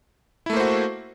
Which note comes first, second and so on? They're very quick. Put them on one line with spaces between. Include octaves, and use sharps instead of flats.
E4 A3 A#3 C5 F#4